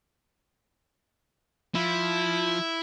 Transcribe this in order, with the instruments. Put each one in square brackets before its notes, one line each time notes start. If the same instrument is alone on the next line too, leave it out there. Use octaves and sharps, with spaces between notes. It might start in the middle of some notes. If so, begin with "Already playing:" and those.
[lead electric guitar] F3 [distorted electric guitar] E4